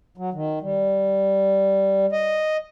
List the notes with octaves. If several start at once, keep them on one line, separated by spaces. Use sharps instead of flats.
F#3
D#3
G3
D#5